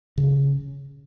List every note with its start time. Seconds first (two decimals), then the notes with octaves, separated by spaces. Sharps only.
0.18 C#3